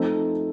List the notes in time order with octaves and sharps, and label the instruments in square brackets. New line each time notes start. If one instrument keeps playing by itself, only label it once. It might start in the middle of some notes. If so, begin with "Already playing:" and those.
Already playing: [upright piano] F3 A3 C4 D#4